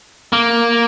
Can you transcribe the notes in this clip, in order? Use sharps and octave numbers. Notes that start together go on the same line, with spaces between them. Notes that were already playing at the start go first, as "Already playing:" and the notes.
A#3